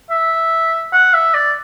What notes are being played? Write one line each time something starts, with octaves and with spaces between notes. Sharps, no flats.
E5
F#5
E5
D5